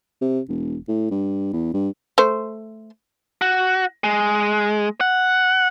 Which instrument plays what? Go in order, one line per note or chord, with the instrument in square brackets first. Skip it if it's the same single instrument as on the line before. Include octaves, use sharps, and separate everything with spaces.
[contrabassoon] C3
E1
A2
G2
E2
G2
[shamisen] A3 C5
[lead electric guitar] F#4
G#3
F#5